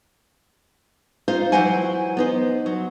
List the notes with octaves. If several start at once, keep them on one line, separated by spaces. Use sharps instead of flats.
D#4 F4 C5 F5
E3 F#3 E4 C5 F#5 G#5
B3 D#4 C5
F#3